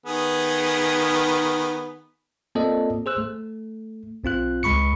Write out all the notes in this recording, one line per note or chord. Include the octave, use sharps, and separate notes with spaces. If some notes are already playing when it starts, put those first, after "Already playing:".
D#3 B3 G#4
A#3 C4 F4 A4 D5 D#5
G#4 C5 E6 F#6
A3
B1 C4 F4 F#6
C#2 G#3 B5 C#6 C#7